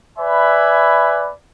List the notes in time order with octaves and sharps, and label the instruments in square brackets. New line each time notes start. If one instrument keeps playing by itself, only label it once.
[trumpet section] B4 D5 E5 G#5 B5